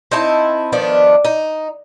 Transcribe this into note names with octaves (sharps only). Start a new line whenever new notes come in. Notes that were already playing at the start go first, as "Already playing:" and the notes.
C4 D#4 E4 A5
D#3 F3 B3 D4
D#4